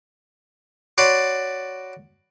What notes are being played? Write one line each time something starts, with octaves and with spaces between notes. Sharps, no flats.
F#4 C#5 D5 A5 B5 C6